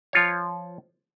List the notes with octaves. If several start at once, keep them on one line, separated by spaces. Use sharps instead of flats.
F3 F4 C#5